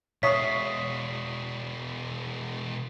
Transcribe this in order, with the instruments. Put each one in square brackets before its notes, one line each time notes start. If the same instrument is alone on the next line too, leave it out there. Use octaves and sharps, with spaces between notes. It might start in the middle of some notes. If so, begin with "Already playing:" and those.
[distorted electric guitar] B2 G#3 [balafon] C#5 [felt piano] E5 C#6 D#6 [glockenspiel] B6 C7